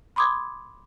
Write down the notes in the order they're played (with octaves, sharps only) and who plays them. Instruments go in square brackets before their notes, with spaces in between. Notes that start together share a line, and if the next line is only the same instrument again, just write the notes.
[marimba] B5 C6 D6 D#6 G#6